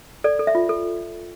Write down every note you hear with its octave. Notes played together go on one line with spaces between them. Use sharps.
A4 D5
A4
E5
F4
A4